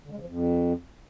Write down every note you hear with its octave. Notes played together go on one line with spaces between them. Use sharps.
D3
G#3
C#3
F3
F2